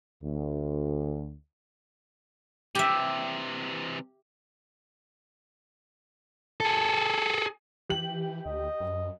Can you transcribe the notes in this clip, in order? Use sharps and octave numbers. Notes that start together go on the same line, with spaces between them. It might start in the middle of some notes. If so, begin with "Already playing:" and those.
D2
C3 E3 G4 E5
G#4 A4
E3 G4 F#7
D2 D#5
F#2